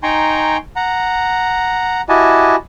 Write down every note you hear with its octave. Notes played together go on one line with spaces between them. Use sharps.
D#4 G5 G#5 A#5 C6 C#6
F#5 A#5
E4 F#4 G4 D#5 G#5 A5